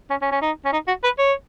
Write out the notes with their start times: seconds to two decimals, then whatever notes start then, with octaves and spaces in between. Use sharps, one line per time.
0.10 C#4
0.22 C#4
0.32 C#4
0.42 D#4
0.65 C#4
0.73 D#4
0.88 F#4
1.04 B4
1.19 C#5